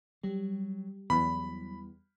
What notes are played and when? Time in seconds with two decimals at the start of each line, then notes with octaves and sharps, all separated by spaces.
0.23 F#3 G3
1.10 E2 F#3 B5